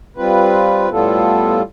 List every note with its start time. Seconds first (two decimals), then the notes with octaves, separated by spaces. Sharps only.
0.17 G3 C4 F4 B4
0.89 A2 G3 B3 F4 A4